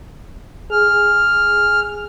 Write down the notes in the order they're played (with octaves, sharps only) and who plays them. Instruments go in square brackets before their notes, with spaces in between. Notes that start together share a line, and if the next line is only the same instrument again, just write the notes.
[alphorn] G#4 [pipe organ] F6